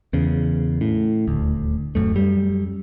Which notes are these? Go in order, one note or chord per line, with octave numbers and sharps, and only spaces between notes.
E2 C#3
A2
D#1 D2
D1 C#2 F#2 A3
F#2 G3